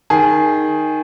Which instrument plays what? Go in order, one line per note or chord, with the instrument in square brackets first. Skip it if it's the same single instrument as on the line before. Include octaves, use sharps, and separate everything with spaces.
[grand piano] D#3 G#4